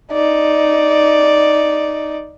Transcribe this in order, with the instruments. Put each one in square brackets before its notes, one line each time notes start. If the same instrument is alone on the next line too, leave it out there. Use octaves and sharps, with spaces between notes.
[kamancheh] D#4 D5